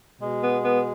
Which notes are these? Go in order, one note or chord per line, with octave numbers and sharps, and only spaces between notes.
B2 G#3
B3
B3